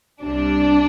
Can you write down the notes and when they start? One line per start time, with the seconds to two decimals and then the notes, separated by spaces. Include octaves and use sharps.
0.22 C2 C3 G3 D4